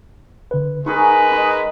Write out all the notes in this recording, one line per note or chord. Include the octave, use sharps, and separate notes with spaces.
D3 B4
G#3 D#4 G#4 A#4 B4 C#6
D#5 B5